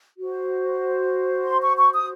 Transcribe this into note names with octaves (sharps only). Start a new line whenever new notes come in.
F#4 C5
C6
C#6
C#6
D#6